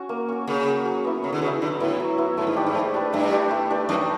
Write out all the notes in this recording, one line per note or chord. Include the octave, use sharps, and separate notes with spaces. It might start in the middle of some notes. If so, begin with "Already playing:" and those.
Already playing: C#4 F#4
A#3
C#4 F#4
C#3 A#3
C#4 F#4
F#3
B3 E4
C#3 F#3
D3
C#3 B3 E4
D3 F#3
A2 B3 E4
F#3
B3 E4
A2 A3
G#2
G2 D4 G4 B4
G#2
A3
D4 G4 B4
G2 A3
D4 G4 B4
A3
D4 G4 B4
F#2 D#4